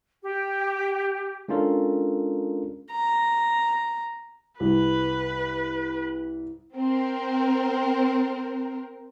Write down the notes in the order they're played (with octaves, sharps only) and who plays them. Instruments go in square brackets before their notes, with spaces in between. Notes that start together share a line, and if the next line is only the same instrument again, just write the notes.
[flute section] G4
[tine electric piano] G#3 C#4 D4 F4 A4 A#4
[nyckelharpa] A#5
[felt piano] C2 [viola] B4
[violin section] C4 A#4